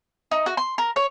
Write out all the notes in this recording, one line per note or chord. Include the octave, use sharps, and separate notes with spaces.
D#4
F#4
C6
A#4
C#5